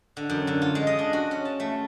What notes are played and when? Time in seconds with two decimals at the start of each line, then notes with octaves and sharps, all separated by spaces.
0.17 D3
0.30 F#2
0.47 D3
0.62 F4
0.75 G#3
0.87 D#5
0.99 D4
1.13 F#4
1.31 C#4
1.45 A5
1.60 A3